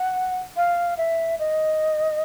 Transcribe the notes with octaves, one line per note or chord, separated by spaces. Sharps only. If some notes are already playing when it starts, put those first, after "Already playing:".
Already playing: F#5
F5
E5
D#5